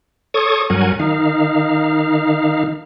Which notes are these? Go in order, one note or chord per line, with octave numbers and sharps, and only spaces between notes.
A4 C#5 C#6 D#6
G2 F#3 A#4 F#5 G#5
D#3 D#4 F5